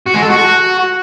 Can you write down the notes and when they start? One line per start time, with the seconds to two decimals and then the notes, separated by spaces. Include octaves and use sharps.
0.06 F#4
0.14 G#3
0.22 A4
0.30 F#4